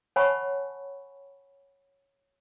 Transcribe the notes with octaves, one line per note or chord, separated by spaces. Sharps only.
C#5 F#5 G#5 A5 B5 C#6